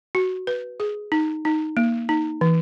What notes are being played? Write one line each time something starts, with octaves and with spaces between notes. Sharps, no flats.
F#4
B4
G#4
D#4
D#4
A#3
D#4
E3